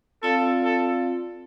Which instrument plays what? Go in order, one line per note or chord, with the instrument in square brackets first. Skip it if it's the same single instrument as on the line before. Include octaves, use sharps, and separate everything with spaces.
[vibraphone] C4 F4 D5 F5 [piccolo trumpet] A4
[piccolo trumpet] A4